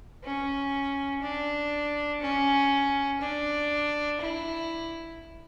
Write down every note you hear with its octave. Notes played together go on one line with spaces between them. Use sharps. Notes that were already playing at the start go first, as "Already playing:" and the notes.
C#4
D4
C#4
D4
E4